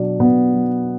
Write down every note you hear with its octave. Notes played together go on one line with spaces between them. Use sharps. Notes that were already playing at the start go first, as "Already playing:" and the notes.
Already playing: B2 F#3 D4
B2 B3
F#3